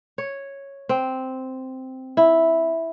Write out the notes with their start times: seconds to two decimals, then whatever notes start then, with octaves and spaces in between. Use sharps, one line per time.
0.18 C#5
0.89 C4
2.17 E4